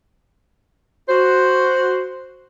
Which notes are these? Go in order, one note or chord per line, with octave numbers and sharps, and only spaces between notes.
F#4 C5